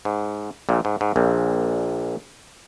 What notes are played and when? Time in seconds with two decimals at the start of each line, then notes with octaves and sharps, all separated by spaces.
0.05 G#2
0.69 A#1 A#2
0.85 G#2
1.01 G#2
1.16 A#1 A#2